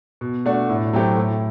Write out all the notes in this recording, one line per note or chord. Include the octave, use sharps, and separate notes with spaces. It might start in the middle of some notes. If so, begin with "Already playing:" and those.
B2
A3 D4 F#4
A2
F#3 A3 C4 G4
A2